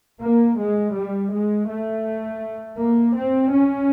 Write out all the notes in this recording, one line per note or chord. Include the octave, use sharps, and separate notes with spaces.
A#3
G#3
G3
G#3
A3
A#3
C4
C#4